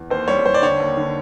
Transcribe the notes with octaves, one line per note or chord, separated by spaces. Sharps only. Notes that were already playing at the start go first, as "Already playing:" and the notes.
Already playing: E2
D#2 C5
G3 C#5
G3 C5
D5
D3 C#5
D#2
D3